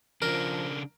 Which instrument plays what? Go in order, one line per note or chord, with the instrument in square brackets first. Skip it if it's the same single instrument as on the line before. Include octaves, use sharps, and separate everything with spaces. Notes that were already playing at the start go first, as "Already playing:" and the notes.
[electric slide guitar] C#3 D4 [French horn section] F3 [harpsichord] A#4